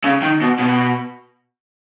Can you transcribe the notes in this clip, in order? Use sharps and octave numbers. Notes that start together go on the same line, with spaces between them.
C#3
D#3
B2
B2